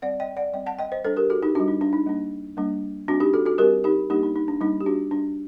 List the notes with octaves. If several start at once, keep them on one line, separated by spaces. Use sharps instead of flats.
G3 C4 D5 F#5
D#5 G5
D5 F#5
G3 C4 D#5 G5
F#5 A5
D#5 G5
C5 D#5
G3 D4 A4 C5
G4 A#4
F#4 A4
D#4 G4
G3 D4 F#4
D#4
D4
D#4
G3 A#3 D4
G3 A#3 D4
G3 C4 D4 F#4
D#4 G4
F#4 A4
F#4 A4
G3 C4 G4 A#4
D#4 G4
G3 A#3 D4 D#4 G4
D#4
D#4
D4
G3 A#3 D4 D#4
G4
D4 F#4
G3 D4